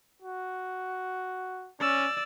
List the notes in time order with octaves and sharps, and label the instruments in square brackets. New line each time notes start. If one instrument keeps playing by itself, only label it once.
[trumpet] F#4
[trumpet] C#4 [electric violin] D5 E6